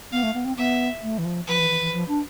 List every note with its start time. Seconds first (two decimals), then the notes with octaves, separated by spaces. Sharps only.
0.12 B3 F5
0.23 A3
0.34 B3
0.45 C4
0.57 B3 E5
1.03 A3
1.18 E3
1.25 F3
1.47 F3 B4
1.59 E3
1.70 E3
1.81 E3
1.93 F3
2.08 D4